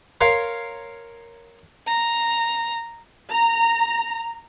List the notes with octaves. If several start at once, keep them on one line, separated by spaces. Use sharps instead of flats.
A#4 C#5 F5 C6
A#5
A#5